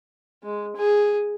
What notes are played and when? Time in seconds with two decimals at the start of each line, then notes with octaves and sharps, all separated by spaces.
0.44 G#3
0.76 G#4